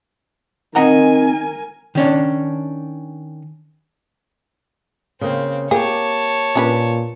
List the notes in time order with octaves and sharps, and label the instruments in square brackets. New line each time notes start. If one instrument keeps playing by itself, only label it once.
[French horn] D#3 [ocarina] C4 [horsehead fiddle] A#4 G#5 [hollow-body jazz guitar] D#5 F#5 A#5
[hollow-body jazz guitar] D#3 C#4 D4
[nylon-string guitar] C#3 A#3 [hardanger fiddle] C4
[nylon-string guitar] A#3 G4 [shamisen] G#4 [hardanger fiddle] C#5 A5
[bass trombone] A#2 [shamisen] C#4 D4 B4